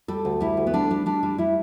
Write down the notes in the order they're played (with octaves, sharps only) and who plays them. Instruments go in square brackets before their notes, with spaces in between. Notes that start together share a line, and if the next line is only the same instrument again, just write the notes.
[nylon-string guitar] G3 A4
D2
G3 E4
D2
B3
G3 D4
G3
G3 D4
G3
G3 E4